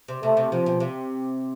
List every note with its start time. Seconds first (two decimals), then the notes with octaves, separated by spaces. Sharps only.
0.08 C3
0.22 C3 A3
0.37 C3
0.52 C3 F3
0.66 B2
0.80 C3